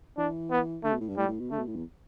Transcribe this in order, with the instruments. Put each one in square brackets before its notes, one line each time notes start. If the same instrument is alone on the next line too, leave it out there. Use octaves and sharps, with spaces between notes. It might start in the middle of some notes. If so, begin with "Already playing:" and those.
[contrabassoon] E3 [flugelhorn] D4
[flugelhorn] B3
[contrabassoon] D3 [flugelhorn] A3
[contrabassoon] B2
A2
G2
[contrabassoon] A2 [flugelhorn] G3
[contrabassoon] A2
B2
[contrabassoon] D3 [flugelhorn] A3
[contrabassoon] B2
A2
E2